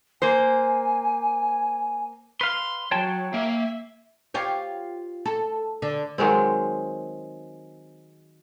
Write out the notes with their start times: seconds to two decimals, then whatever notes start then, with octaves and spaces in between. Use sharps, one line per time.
0.22 A#3 C5 G#5
2.41 B4 F5 C6
2.91 F#3 C#5 G5 A5
3.34 A#3 E5
4.34 F4 G4 C#5
5.26 A4
5.82 D3
6.18 D#3 F#3 G#3 C4